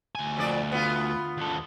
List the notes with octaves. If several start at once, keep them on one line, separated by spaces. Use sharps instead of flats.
D2 G#5
F2 A#2 D5
B3 F4
D#2 A4